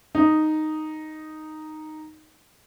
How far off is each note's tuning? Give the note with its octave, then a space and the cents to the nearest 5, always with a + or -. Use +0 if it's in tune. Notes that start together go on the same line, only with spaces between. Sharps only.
D#4 -5